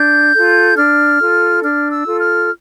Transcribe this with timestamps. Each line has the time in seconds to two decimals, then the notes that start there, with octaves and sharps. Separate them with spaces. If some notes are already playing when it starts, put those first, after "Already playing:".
Already playing: D4 G6
0.34 F4 A4
0.77 D4 F6
1.20 F4 A4
1.63 D4 F6
1.92 E6
2.07 F4 A4
2.20 F6